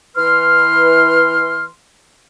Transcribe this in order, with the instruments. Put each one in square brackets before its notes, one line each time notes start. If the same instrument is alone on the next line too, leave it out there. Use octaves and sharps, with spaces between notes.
[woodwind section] E3 B4 C6 F6